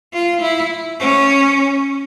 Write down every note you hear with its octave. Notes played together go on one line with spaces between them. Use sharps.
F4
E4
C#4